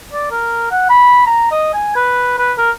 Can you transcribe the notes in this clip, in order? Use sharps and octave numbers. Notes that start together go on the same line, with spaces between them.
D5
A#4
F#5
B5
A#5
D#5
G#5
B4
B4
A#4